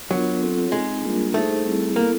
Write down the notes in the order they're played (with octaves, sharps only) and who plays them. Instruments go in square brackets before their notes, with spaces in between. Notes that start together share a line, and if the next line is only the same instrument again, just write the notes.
[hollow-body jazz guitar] F#3 [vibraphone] B3 D4 F4 A#4
[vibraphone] C4 F4 A4 C#5
[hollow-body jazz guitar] G#3 [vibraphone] C4 D#4 G#4
[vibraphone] G3 A#3 D4 F4 A#4
[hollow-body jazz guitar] A3 [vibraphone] D#4 G#4 C5
[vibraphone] G3 C4 E4 G#4
[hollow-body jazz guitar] A#3 [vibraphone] B3 E4 A4